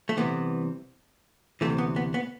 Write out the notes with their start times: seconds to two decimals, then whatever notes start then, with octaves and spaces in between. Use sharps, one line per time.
0.09 A3
0.17 C2 C3 E3 B3
1.61 D2 C3 E3 A3
1.78 B3
1.96 B3
2.14 B3